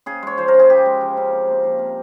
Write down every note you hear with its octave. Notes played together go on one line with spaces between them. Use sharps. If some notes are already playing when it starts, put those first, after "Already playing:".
C#3 G#4
G#3 C#5
F3 C5
A#4
C#3
G#4
C#3 G4
G#3
F3
C#3
C3
A#3
F3
C3